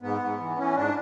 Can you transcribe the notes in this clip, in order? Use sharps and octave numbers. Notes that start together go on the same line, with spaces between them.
G#2 B3
G#2
E3
E3 C#4
G#2 D4